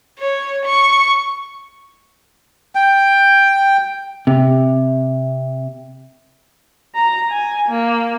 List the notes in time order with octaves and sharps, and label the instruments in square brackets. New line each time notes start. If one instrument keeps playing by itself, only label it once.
[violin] C#5
C#6
[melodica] G5
[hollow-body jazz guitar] C3
[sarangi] A#5
G#5
A#3